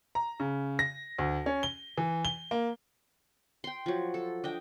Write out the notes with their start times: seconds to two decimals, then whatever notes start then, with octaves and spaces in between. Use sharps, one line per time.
0.15 A#5
0.40 C#3
0.79 A#6
1.19 D2
1.46 C#4
1.63 G7
1.98 E3
2.25 G7
2.51 A#3
3.64 G5 C6
3.86 F3 F#3
4.14 A4
4.44 D4 D#5 G5